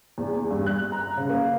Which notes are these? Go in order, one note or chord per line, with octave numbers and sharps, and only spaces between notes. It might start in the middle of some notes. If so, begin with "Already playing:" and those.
E2
E2
G2
F#6
A#5
C#3
A#3